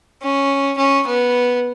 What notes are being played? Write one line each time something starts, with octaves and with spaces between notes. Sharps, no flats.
C#4
C#4
B3